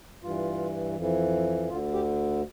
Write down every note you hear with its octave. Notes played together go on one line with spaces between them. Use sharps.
G2 E3 F4
F2 E3
D2 D3 F4
G4